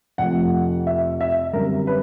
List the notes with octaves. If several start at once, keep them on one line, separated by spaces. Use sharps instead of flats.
F2 C3 F3 A3 F#5
E5
E5
F#2 D3 G3 C4 A#4
B4